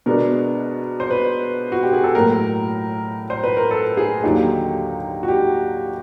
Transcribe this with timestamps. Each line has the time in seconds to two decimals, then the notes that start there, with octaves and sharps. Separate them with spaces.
0.06 B2 G#3 B3 D4 A#4
1.00 C5
1.11 B4
1.72 F#4
1.83 G4
1.93 G#4
2.04 A4
2.15 A2 F#3 A#3 A#4
3.30 C5
3.44 B4
3.57 A#4
3.71 A4
3.97 G#4
4.23 D#2 D3 F#3 A#3 D#4 G4
5.23 F#4
5.28 G4